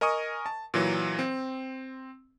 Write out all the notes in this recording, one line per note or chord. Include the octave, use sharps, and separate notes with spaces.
A#4 D#5 G#5 C#6 D#6
A5
A#2 E3 F#3
C4